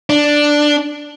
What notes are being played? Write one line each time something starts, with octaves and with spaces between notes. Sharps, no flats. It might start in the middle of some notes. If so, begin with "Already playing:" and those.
D4